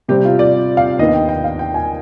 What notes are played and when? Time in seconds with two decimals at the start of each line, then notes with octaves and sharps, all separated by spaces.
0.08 C3 G3 C4 G4
0.25 F4
0.39 D5
0.77 F5
0.99 D#2 D#3 B3 D4 D#5
1.14 G5
1.29 G5
1.44 F5
1.59 G5
1.74 G#5